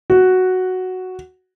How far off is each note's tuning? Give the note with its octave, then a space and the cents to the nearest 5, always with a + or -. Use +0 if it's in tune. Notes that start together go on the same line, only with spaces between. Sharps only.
F#4 +0